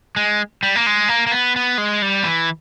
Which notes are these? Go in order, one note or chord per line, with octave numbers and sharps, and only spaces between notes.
G#3
G3
A#3
G#3
A#3
A#3
B3
B3
G#3
G3
E3